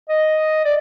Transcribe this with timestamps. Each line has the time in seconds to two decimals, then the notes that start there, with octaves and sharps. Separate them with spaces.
0.09 D#5
0.64 D5